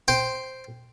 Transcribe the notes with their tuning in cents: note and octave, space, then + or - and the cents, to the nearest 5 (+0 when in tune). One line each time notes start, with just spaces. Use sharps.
C5 +0 G5 +0